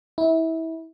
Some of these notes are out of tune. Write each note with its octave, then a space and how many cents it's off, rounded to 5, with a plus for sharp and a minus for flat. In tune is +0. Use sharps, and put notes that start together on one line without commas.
E4 -25